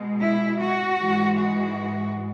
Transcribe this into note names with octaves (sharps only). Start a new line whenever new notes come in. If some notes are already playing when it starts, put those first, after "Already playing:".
Already playing: B2 G#3
E4
F#4
G#2 E3 G#3
F#4